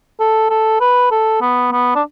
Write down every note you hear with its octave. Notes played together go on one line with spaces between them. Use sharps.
A4
A4
B4
A4
B3
B3
D4